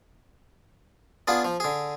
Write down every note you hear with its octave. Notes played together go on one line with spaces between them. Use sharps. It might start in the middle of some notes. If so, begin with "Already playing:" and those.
B3 D4 F4 G#4
F3
D3 G#4